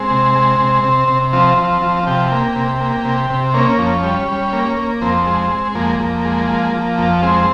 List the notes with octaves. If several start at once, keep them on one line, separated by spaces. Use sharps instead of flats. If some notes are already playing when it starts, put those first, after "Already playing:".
Already playing: G#3 C4
C3
G#3
C3
C3
C3
F3 C4
F3
F3
C3 G4
A#3
C3
A#3
C3
C3
A#3 C#4
F2
G3
G3
A#3
A#3
F2 C4
G#3
G#3
F2 A#3
F2
G#3
F3
F3
F2
G#3 C4